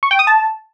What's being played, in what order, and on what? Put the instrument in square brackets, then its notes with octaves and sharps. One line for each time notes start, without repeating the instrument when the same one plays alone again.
[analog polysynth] C#6
G5
D#6
A5